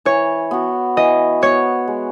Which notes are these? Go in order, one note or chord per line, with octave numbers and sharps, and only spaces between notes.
E3 C#5
B3 F#4
E3 D#5
B3 F#4 C#5
G#3